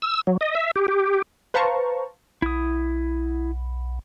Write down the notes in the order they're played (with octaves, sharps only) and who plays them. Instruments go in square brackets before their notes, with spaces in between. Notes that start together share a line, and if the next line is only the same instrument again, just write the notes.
[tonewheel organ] E6
F#3
D#5
E5
G4
G4
[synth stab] B4 C5 F5 A5 A#5 C#6
[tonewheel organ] B1 [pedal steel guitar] E4 D#6